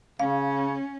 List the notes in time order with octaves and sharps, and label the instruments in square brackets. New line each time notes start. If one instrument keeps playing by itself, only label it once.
[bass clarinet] C#3 [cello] C#4 [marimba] F5